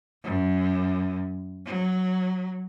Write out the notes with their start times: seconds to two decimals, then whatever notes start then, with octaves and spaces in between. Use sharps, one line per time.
0.24 F#2
1.65 F#3